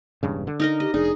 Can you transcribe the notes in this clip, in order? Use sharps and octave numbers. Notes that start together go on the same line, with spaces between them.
E1 G2 C#3
D3
D#4 A#4 D#5
G4 D#5
F1 D4 D#4 G#4